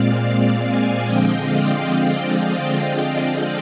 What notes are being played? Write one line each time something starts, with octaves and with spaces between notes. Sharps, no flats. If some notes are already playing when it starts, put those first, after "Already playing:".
Already playing: A#2 G#3 C4 D5 F5
D5 F5
F5 G#5
D3 F3 G#3 C4 D#5 G5
D5 F5